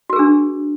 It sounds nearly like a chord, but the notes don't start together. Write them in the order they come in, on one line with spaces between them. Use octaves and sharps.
F#4 A#4 G#4 D4